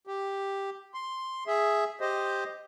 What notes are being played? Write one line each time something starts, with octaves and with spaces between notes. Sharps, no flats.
G4
C6
G#4 E5
G4 C5 D#5